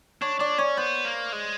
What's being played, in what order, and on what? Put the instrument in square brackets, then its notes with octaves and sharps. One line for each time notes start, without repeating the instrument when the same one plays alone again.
[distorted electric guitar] D4 [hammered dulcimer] C#5
[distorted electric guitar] D4 [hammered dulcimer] D5
[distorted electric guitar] C#4 [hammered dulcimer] C#5
[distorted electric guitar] B3 [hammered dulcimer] C5
[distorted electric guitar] A#3
G#3